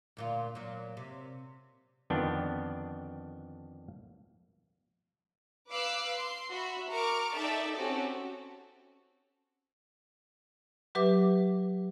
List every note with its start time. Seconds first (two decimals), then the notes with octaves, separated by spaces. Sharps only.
0.17 D2 A#2 F4
0.55 A#2 F#3
0.97 C3
2.10 F2 D3 D#3 B3 D4 G5
5.69 B4 F5 D6 E6 F#6 C7
6.14 C6
6.53 F#4 E5 B5
6.91 A#4 C#6 D6 F6 D7
7.36 D#4 A4 D5 E5 G5 A5
7.74 C4 C#4 F#4 G4 A4
10.95 F#3 G4 B4 E5 D6